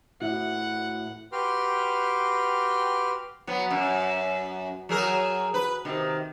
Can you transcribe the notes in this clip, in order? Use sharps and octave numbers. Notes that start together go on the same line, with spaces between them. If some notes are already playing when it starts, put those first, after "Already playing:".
A2 E4 F#4 E5 F#5
F#4 G4 B4 G5 C6 F6
F#3 B3
F#2
F#3 G#4 A#4
B4
C3 D#3